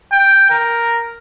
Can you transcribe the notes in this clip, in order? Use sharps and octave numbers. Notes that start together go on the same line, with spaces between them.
G5
A#4